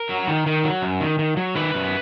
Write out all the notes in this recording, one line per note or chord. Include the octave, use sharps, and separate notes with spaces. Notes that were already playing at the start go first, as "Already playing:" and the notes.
Already playing: A#4
F#3
D#3
D#3
F#3
F#2
D#3
D#3
F#3
D#3 B4
F#2